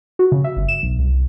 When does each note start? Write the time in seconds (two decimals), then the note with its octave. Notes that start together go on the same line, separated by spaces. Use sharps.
0.19 F#4
0.32 C#3
0.44 E5
0.56 G1
0.68 E7
0.83 B1
0.99 C2